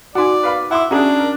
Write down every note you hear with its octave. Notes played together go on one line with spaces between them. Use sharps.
D#4 F#4 D5 F#5 G#5
B4 F5 B5
E4 F#5 C6 D6
C#4 D4 F#4 G#4 A#5 D#6
A#4